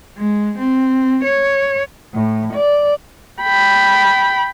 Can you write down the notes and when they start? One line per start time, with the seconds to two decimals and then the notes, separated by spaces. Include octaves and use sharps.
0.17 G#3
0.58 C4
1.24 C#5
2.14 A2
2.54 D5
3.42 G5 B5